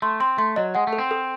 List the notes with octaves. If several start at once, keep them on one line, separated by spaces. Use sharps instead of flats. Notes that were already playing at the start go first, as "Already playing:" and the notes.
A3 C6
C4 C6
A3 C6
F#3 D#5
G#3 F#5
A3
A4
C4
A4